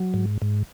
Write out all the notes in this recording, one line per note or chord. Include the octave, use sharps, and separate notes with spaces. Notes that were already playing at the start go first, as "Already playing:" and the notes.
Already playing: F#3
G#2
G#2